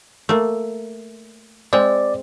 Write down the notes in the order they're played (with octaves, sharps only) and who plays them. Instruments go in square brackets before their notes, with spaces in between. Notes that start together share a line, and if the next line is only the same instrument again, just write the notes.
[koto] A3 A#3
[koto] G#3 C4 [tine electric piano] D5